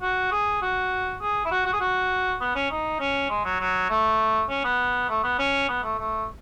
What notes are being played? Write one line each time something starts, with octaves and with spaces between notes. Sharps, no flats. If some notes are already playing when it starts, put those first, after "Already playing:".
F#4
G#4
F#4
G#4
E4
F#4
F#4
G#4
F#4
B3
C#4
D#4
C#4
G#3
F#3
F#3
A3
C#4
B3
A3
B3
C#4
B3
A3
A3